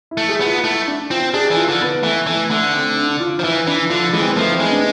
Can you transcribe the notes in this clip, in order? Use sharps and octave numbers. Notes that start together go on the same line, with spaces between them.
E4
A3
G#4
B3
F4
A3 E4
D4
C4 F4
D4 G#4
E3
F4
D3
B3
E3 A3
E3 A3
D3 A3
C4
D4
F4
F3
E3 E4
E3 D4
D3 F3
E3 G#3
C4
B3
F3 A3
C4
G#3 B3
D4